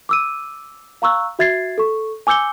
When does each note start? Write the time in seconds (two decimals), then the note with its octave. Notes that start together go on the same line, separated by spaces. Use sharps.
0.09 D6 E6 D#7
1.02 F5 A#5 C#6 E6 F#6
1.39 F#4 E5 G#6 A6 C7
1.78 A4 C#6
2.27 G#5 D6 E6 G6 C#7 G7